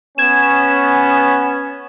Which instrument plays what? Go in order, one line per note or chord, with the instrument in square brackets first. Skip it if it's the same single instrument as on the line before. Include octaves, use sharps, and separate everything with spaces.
[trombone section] B3 C#4 [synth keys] G#6 E7